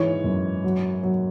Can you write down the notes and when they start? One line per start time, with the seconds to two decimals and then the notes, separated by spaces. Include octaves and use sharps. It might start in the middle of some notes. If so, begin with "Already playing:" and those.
Already playing: G#2 E3 C#5
0.24 F#2
0.64 F#3
1.03 F#3